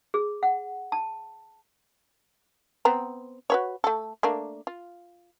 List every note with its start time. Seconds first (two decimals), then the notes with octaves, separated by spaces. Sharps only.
0.14 G#4
0.43 F#5
0.92 A5
2.85 B3 C4 A#5
3.50 F#4 B4 C#5
3.84 A3 A4
4.23 A3 A#3 D4
4.67 F4